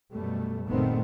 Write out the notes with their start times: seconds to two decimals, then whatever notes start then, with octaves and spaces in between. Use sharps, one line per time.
0.12 F#2 B2 G3 A3
0.68 F#1 A#2 D#3 A3 B3 C4